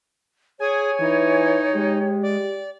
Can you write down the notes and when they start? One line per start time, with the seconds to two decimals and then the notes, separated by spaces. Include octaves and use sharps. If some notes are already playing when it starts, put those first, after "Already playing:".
0.60 G#4 C#5 G#5
1.00 E3 D#4
1.74 G#3 G4
2.22 D5